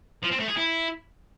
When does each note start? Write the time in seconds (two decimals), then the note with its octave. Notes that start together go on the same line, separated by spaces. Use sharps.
0.23 F3
0.31 C4
0.40 A3
0.48 G#4
0.57 E4